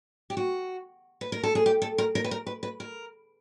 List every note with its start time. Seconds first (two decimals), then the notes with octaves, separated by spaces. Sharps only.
0.30 G4
0.37 F#4
1.21 B4
1.32 A#4
1.43 A4
1.55 G#4
1.66 G4
1.82 A4
1.98 A#4
2.15 A#4
2.24 B4
2.31 A#4
2.47 B4
2.63 B4
2.80 A#4